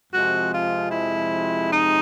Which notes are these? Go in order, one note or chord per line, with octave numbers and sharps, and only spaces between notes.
F2 C3 F3 G#3 F#4
F4
E4
D#4